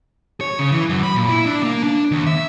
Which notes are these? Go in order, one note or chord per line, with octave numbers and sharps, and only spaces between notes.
C#5
C#3
E3
F#2
B5
A#2
E4
D4
A#3
D4
D#2
E5